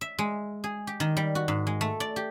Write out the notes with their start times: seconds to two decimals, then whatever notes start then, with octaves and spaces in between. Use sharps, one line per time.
0.01 E5
0.19 G#3
0.64 G#4
0.87 G4
1.00 D#3
1.17 G3
1.35 F#4
1.48 G#2
1.67 G#3
1.81 A3
2.00 D5
2.16 G4